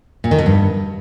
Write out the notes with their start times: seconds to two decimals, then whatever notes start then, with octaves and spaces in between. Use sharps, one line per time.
0.24 A#2
0.31 D#3
0.39 B2
0.46 G2